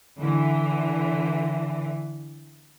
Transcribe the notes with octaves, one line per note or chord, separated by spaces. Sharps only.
D3 E3